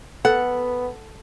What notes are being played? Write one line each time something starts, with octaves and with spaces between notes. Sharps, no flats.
B3 A4 F#5